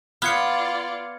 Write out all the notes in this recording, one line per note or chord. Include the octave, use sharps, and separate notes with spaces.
B3 F4 D5 F6 G#6 C#7